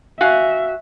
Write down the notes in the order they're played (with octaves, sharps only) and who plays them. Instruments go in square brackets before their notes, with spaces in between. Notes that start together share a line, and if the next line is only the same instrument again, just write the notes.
[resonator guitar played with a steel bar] F#4 F5 G#5 [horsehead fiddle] E5